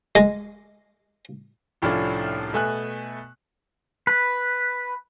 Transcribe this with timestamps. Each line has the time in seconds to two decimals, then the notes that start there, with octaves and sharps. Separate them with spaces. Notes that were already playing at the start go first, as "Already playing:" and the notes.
0.15 G#3
1.82 C2 A2 F3 C#4 D4 A4
2.53 B2 A3 G#5 F#6
4.07 B4